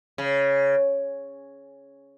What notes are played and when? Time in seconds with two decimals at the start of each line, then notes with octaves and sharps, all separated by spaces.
0.18 C#3